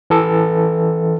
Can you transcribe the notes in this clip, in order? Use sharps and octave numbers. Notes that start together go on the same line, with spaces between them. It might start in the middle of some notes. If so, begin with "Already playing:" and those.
E3 A4